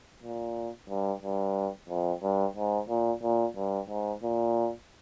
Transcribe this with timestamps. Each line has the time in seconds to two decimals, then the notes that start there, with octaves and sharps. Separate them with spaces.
0.23 A#2
0.89 G2
1.22 G2
1.89 F2
2.23 G2
2.56 G#2
2.89 A#2
3.23 A#2
3.56 G2
3.89 G#2
4.23 A#2